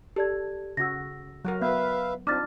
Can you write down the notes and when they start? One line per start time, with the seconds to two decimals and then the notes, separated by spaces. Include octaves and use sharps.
0.16 G4 A4 D5 G#6
0.77 C#3 F#4 E6 A#6
1.45 F#3 F#4 A#4
1.62 B3 B4 E5 F5
2.27 C4 D4 D#4 F4 D6 F6 A6